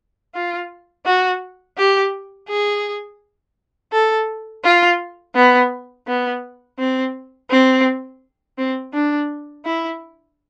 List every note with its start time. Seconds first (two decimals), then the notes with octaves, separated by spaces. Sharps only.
0.34 F4
1.05 F#4
1.78 G4
2.48 G#4
3.92 A4
4.64 F4
5.35 B3
6.07 B3
6.79 C4
7.50 C4
8.58 C4
8.93 D4
9.65 E4